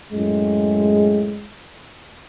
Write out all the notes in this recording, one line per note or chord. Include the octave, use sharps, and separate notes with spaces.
F#2 A2 G#3